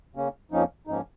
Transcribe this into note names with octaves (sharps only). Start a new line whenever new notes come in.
C#3 A#3 C#4
F2 F3 A#3 C#4 D#4
G#2 F3 A#3 C#4 D#4